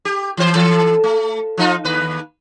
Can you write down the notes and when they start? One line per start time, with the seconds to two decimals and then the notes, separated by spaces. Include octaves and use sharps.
0.05 G4
0.37 E3 C5
0.55 E3 A4
1.04 A3
1.57 F3 D#4 F4
1.85 D#2 B4